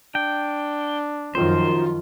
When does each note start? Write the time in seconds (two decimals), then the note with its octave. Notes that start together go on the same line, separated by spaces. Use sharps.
0.15 D4 G5
1.35 F#2 D#3 F3 F4 C5